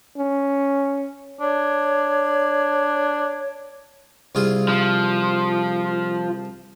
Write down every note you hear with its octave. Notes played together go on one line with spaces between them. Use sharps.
C#4
D4 C#5
C2 F4 G#4
F3